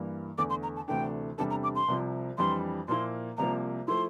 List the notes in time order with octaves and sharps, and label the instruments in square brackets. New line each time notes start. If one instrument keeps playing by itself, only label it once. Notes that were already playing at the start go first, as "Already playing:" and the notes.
Already playing: [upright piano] G2 E3 A#3
[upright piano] E2 D3 A3 [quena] D6
[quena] C6
A#5
A5
[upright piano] D2 C3 E3 A3 D4 [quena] G5
[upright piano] E2 C3 G3 D4 A4 [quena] A5
[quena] A#5
D6
C6
[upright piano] C2 C3 F3
[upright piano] F2 E3 G3 D4 [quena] C6
[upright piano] A#2 F3 A#3 E4 [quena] C6
[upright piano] C2 C3 F3 A#3 [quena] A#5
[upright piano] F3 A3 E4 [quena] C6